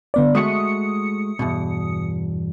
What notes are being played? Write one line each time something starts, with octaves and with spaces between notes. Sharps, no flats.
D3 B3 D5
G#3 A3 F#4 D#6 C#7
E2 G2 B2